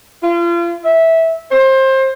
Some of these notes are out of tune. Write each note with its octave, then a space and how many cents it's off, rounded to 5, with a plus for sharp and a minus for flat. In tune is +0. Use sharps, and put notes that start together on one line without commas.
F4 -35
E5 -15
C5 +25